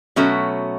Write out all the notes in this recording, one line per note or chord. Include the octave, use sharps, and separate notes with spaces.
B2 F#3 A3 C#4 F#4